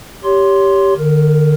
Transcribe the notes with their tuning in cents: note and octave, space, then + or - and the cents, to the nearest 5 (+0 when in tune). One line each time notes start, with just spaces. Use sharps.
G4 +0 C#5 +20 C6 +0
D3 +35 A#4 +0